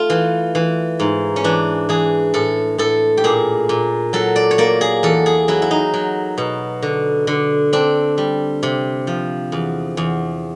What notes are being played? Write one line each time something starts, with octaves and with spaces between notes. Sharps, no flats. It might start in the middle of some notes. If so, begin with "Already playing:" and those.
Already playing: A3 F4
E3
E3
G#2
C#4
E3 D4
E3 G#4
A2 A4
A2 A4
G4
A#2 G#4
A#2
F#3 A4
D5
C#5
A#3 D5
G#4
E2 A4
G#4
F#3 E4
E4
D#4
F#3
B2
D3
D3
C4 D4
G3
C3
F3
E2
E2